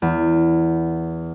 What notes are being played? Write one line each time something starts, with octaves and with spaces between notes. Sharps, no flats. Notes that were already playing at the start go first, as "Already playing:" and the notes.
E2